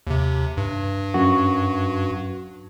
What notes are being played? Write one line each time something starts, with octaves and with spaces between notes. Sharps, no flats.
D#2 C3
G2
F#2 F#4